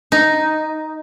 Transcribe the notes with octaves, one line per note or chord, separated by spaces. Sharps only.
D#4